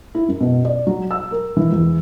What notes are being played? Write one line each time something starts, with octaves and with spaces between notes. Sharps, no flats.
E4
F#2
B2
D5
F#3
E6
A#4
E3
E2